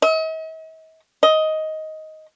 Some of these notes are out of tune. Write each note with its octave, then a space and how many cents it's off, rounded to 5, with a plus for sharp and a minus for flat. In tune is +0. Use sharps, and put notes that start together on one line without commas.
D#5 +45
D#5 +10